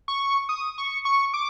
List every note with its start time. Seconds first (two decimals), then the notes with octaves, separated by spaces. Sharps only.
0.08 C#6
0.49 D#6
0.78 C#6
1.05 C#6
1.34 D6